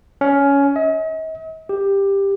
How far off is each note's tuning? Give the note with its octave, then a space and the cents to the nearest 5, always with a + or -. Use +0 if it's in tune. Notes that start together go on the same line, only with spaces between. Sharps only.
C#4 +15
D#5 +45
G4 +10